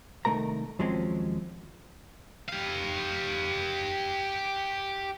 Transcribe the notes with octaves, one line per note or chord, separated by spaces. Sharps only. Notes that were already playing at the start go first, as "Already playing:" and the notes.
C2 D#3 F#3 A3 A#4 A#5
D#2 F3 F#3 G#3 C4 C#4
G4 F5